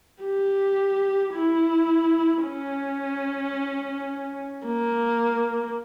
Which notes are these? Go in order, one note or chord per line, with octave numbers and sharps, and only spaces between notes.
G4
E4
C#4
A#3